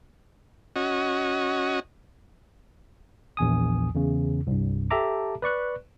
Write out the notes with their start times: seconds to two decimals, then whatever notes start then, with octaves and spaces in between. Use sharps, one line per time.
0.76 C#4 F#4 D#5
3.37 A#1 E2 G#5 D#6
3.95 E2 C#3
4.47 C2 G2
4.91 G4 A4 E5 A5 A#5 D6
5.42 B4 D5 C#6 F#6